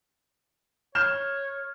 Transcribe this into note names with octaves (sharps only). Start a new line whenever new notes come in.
C#5 F6 G6 E7